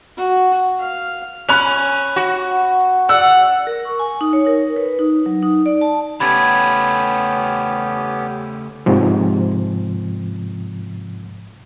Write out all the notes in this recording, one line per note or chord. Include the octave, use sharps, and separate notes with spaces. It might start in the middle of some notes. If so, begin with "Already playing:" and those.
F#4
F5
C#4 B5 F#6 F7
F#4
D5 F#5 E6
A#4
C#6
G#5
D#4
C#5
A#4
B4
D#4
F#3
D#4
D5
A5
C#3 A3 B3 C#4 G4 B5 G#6 A6
G#2 C3 F3